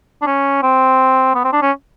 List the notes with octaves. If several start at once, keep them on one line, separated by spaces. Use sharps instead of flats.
D4
C#4
C4
B3
C4
D4
C#4